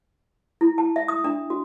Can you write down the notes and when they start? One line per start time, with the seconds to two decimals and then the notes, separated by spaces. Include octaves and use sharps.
0.61 E4
0.78 A5
0.96 E5
1.08 D#6
1.24 D4
1.50 F#4